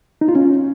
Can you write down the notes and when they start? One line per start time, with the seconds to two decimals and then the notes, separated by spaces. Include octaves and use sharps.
0.21 D#4
0.28 F4
0.35 C#4